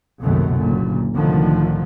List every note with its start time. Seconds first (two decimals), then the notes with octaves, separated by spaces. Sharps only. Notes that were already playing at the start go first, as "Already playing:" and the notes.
0.21 F#1 C2 F#2 B2 D#3 A3
0.56 F#1 A#2 D3
1.13 C2 A2 D3 D#3 F3